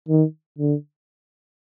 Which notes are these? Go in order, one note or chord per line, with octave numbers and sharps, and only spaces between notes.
D#3
D3